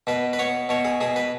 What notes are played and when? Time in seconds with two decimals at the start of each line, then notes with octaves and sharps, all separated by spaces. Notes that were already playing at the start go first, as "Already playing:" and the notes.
0.07 B2 B4
0.33 B4
0.39 B3 C#5
0.69 B2 C#5
0.85 G#4
1.01 B2 G#4
1.16 B4